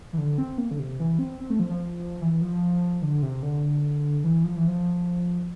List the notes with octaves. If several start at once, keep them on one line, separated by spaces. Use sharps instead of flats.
E3
D3
C4
A#3
D3
C3
E3
C4
C4
A3
F3
F3
E3
F3
D3
C3
D3
E3
F3
E3
F3